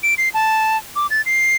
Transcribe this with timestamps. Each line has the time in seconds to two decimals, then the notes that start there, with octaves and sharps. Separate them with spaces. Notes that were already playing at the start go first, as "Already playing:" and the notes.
0.03 D7
0.18 C7
0.34 A5
0.96 D6
1.10 A6
1.26 C7